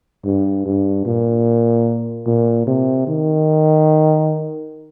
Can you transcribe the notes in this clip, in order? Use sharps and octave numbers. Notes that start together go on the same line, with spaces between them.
G2
G2
A#2
A#2
C3
D#3